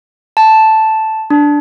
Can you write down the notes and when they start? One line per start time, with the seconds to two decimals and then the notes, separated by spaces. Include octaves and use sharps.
0.37 A5
1.30 D4